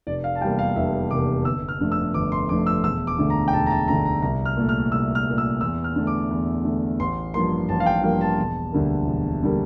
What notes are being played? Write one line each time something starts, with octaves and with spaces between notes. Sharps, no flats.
F1 D5
F5
A5
E2 C3 G3 A#3 G5
F5
F1 E5
E2 C3 G3 A#3 D6
G1 E6
F6
F2 D3 A3
E6
G1 D6
C6
F2 D3 A3 D6
E6
E1 E6
D6
D2 D3 A3
A#5
G5
E1 A5
A#5
A5
D2 D3 A3 A#5
A#5
C2 A#5
F6
A#2 A3
F6
C2 E6
F6
A#2 A3
E6
E2 E6
F6
D3 A3
D6
E2
D3 A3
A1 C6
G2 F3 A#3 C6
A1 A5
F5
G5
G2 F3 A#3 F5
A5
E1
D2 D3 G3 A#3
E1
D3 G3 A#3